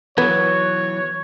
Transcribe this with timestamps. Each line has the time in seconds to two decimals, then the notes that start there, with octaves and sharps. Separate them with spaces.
0.18 E3 F#3 B3 C#5 G#6